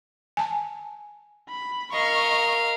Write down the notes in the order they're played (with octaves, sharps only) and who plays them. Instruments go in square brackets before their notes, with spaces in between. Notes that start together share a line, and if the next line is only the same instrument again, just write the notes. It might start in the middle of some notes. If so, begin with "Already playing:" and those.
[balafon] G#5 A5
[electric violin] B5
[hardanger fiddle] A#4 F5 [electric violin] D#5 C#6